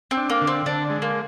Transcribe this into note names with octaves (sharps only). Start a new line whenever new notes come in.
C4
D4
A#3
D3
C4
D3 D4
G#3
A#3